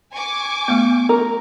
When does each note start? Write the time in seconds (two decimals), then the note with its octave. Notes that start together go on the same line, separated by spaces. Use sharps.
0.13 G#5 C#6 D6
0.68 A3 B3
1.09 A#4